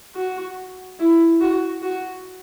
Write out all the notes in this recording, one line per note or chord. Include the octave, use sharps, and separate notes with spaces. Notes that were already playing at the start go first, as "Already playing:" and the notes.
F#4
E4
F#4
F#4